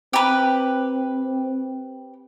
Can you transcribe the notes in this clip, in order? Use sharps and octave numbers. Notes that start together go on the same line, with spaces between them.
C4 G4 B4